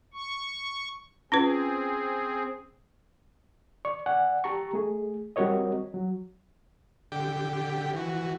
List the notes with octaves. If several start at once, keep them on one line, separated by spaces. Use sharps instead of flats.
C#6
C4 C#4 F4 G#4 B4
D5 C#6
D5 F#5 G#5
G4 A5 A#5 C#6
A3 G#4
G3 C4 F#4 A#4 C#5 D#5
F#3
D3 G4 G5
E3 F#4